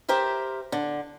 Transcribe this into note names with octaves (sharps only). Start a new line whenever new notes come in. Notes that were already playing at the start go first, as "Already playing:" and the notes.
G4 A#4 C5 E5
D3